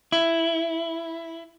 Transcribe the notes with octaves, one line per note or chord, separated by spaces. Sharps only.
E4